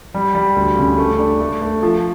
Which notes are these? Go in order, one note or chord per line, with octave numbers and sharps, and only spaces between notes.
G3
G3
D2
C#3
A3
D4
A3
A3
F3